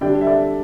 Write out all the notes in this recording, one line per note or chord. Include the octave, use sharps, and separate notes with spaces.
D3 G3 D4 D5 G5
E5
A4 D5